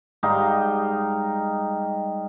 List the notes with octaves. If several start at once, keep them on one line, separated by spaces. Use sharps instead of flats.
G#2 G3 D#4 F5